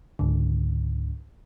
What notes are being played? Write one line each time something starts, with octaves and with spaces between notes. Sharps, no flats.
C#2 G#2 D3